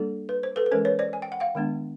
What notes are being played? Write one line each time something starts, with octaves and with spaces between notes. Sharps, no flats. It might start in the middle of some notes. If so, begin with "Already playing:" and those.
Already playing: G3 A#3 D4 A4
B4
C5
A4 B4
B4
E3 G#3 C#4 A#4 C5
B4 C#5
C5 D5
G#5
G5
F#5
F5 G5
D#3 G#3 B3 D4